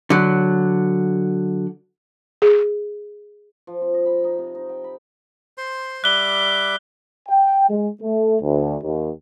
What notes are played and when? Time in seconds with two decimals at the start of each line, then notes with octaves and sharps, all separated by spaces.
0.10 D3 F#3
2.42 G#4
3.67 F3
3.82 C4
3.94 D#5
4.06 B5
4.24 D#4
4.38 C3
4.55 D#4
4.69 G5
4.84 B5
5.58 C5 C6
6.04 G3 E5 D6 F#6 G7
7.28 G5
7.69 G#3
8.01 A3
8.41 D2
8.83 D#2